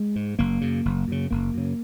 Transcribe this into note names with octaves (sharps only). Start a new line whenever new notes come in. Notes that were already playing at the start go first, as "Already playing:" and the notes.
Already playing: G#3
G#2
F#1 A#3
F#2 C#3
F#1
F#2 C#3
F#1 A#3
F#2 C#3